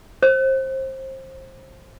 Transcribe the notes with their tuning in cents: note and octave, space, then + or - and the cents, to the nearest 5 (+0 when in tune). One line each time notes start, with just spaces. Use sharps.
C5 +25